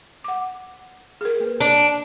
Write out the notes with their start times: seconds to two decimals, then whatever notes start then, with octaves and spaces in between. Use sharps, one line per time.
0.24 F#5 D6
1.21 G#4 A#4
1.40 A#3 B4
1.61 D4